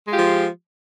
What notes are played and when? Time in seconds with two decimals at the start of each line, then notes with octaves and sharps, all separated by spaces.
0.07 G#3
0.10 F4
0.14 G4
0.17 F3